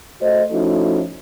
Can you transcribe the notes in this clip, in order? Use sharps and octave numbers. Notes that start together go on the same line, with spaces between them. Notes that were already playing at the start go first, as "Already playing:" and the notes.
A3 F#4 C5 D#5
F3 A3 C#4 D#4 E4 F#4